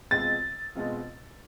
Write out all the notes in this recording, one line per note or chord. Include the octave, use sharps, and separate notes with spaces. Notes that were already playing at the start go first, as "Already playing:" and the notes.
B2 G#3 C4 F4 A6
B2 G#3 C4 F4